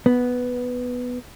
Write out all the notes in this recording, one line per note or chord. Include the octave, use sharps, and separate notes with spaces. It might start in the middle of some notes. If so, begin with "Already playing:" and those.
B3